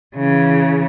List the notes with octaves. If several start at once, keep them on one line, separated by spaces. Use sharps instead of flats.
C#3 E3